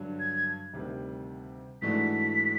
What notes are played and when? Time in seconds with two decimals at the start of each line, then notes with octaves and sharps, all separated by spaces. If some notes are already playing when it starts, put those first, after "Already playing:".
Already playing: G2 D3 F#3
0.20 G#6
0.73 D2 C3 D#3 G3
1.82 G#2 E3 A3 D4 F#4 B6